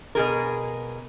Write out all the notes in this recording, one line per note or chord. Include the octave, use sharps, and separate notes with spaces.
B2 G#4 A#4